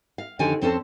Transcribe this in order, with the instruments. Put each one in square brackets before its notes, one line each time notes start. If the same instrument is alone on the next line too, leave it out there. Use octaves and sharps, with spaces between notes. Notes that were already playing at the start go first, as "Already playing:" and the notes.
[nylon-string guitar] F5
F2 D3 D#3 C#4 G4 G#5
F2 C4 C#4 A4 C5 A5